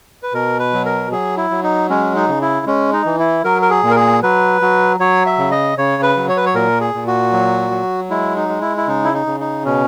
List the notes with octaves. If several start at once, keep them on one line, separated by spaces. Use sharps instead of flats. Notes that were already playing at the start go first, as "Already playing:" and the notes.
B4
B2 A#4
B4
F#3
A#4
F#3 G#4
E4
F#3
D#4
G#3 C#4
D#4
C#3
E4
G#3 C#4
D#4
E3
E4
F#3 A#4
A#4
G#4
A#2
A#4
G#4
F#3 B4
F#3
F#3 C#5
E5
C#3
D#5
C#3 C#5
B4
F#3
C#5
B4
C#5
A#2 A#4
G#4
A#2
F#4
F#3
F#3
G#3 E4
D#4
G#3
E4
E4
C#3 D#4
E4
D#4
C#3
D#4
B2 C#4